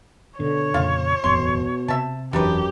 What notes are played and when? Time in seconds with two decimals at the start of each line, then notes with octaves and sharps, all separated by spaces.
0.40 B2 D3 C#5
0.74 F2 A#2 C#3 F4 F5
1.24 D#1 A1 F2 B2 C6
1.88 C3 E5 A5
2.33 E1 F#2 E3 D4 D#4 G4 B4